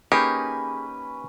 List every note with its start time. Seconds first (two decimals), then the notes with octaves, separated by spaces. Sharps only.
0.12 A#3 C#4 D#4 G4 G#4 B4